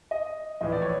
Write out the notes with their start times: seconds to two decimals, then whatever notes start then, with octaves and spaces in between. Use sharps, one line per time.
0.11 D#5
0.61 A#1 A2 E3 D#5
0.72 D5
0.82 C#5